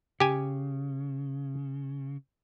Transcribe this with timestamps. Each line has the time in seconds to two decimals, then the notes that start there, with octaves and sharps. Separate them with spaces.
0.20 C#3 G4 G#5